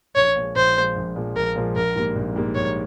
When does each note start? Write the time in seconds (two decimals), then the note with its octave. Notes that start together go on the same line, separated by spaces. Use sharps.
0.16 A#1 C#5
0.36 A#2 F3 G#3
0.56 A#1 C5
0.76 A#2 F3 G#3
0.96 A#1
1.16 A#2 F3 G#3
1.35 A#1 A#4
1.56 A#2 F3 G#3
1.75 A#1 A#4
1.95 G#2 G3 A#3
2.15 A#1
2.36 G#2 G3 A#3
2.55 A#1 C#5